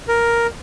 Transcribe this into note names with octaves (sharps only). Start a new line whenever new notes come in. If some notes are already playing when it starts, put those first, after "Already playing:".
A#4